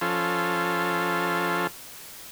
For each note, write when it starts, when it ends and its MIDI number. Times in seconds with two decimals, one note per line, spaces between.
0.01 1.67 53
0.01 1.67 61
0.01 1.67 65
0.01 1.67 69